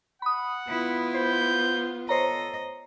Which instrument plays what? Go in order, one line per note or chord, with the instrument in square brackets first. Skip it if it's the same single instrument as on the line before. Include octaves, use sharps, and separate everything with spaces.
[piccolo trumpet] F#5 [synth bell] B5 D#6
[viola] B3 F4 [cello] E4
[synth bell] C5 [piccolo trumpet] G6
[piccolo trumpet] A4 [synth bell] C5 C#5 A#5 [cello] D#5